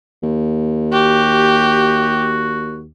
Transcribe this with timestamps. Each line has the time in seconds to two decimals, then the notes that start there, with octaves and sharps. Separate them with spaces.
0.23 D#2
0.93 F#4 G4